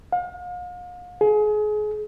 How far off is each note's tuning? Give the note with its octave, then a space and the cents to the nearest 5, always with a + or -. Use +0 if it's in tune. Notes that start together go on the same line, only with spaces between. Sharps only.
F5 +40
G#4 +30